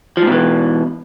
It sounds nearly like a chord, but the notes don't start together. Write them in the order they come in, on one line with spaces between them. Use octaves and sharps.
F3 G#2 B2 E3